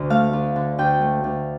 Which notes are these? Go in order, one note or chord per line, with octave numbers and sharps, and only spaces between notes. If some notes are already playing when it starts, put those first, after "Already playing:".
Already playing: D2 D3 D5
A3 F5
D2
D3
D2 G5
A3
D2